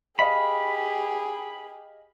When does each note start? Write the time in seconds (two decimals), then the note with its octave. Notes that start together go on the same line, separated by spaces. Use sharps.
0.19 G4 G#4 D#5 F5 B5